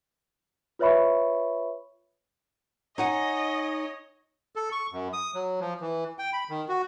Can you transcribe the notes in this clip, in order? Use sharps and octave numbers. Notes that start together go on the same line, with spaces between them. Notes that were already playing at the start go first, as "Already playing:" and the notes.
F4 B4 C#5 E5 B5 C#6
D#4 C#5 D#5 F#5 G#5
A4
C#6
F#2
D#6
F#3
F3
E3
G5
B5
D#3
F#4